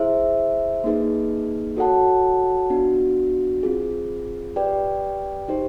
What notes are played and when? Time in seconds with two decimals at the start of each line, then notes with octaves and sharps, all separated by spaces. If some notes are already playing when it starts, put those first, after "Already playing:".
Already playing: E4 G#4 C5 E5
0.84 A#3 D#4 G#4 B4
1.77 F#4 A4 C#5 F#5 A5
2.70 B3 D4 F#4
3.63 C4 F4 G#4
4.56 G4 B4 D5 G5
5.48 D#4 G4 C5